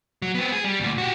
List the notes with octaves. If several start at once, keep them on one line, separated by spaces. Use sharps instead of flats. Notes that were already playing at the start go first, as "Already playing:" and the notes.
F#3
B3 C4
G#4
G3
D2 A#2
F#4 G4